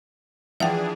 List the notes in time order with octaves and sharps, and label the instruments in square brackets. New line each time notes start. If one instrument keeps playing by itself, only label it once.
[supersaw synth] E3 D4 G#4 [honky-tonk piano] F3 [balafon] E5 F#5 G5